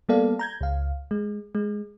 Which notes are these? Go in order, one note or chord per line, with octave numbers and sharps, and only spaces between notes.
G3 A#3 B3 A4 D5 F5
A#5 G6 G#6
C#2 F5
G#3
G#3